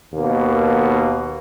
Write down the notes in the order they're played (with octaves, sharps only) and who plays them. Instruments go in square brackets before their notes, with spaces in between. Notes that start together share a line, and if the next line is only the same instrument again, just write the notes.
[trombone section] D#2 B2 A#3